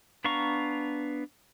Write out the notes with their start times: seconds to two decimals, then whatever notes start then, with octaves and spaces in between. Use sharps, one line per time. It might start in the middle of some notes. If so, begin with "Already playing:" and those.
0.25 B3 D4 F5 A#5 C#6